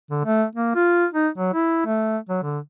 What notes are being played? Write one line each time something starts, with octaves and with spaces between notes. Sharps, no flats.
D3
A3
A#3
F4
D#4
F#3
E4
A3
F#3
D3